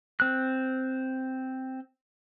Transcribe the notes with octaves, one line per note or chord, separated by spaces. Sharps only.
C4 F#6